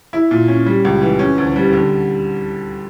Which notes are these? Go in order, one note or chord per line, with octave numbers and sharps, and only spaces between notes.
E4
A#2
C#4
G3
C#2
E3
C#4
D2
G3
D3